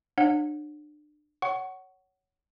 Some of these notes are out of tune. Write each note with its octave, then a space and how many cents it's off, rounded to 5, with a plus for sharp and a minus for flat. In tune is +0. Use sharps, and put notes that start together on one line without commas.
D4 +35 C#5 -25 F#5 -30
C#5 +10 F#5 +20 C#6 +0